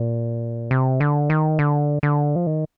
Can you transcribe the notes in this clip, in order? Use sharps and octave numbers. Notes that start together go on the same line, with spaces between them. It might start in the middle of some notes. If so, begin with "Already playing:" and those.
Already playing: A#2
C3
D3
D#3
D3
D3
F3
D#3